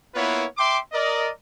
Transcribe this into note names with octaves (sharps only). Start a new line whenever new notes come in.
A#3 B3 E4 F4 B4 C#5
E5 G5 C6 D6
A#4 D5 D#5